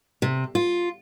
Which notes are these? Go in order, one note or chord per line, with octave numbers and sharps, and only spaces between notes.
C3
F4